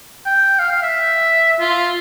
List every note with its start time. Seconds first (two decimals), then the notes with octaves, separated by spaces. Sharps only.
0.26 G5
0.59 F5
0.71 F5
0.83 E5
1.60 F4